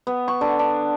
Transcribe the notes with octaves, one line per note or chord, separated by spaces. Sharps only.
B3
C#6
D3
D4